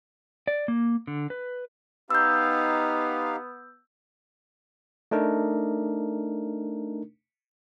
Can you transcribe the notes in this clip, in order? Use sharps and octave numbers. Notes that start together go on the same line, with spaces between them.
D5
A#3
D3
B4
B3 D#4 G4 F5 E6 G6
A3 D4 D#4 A#4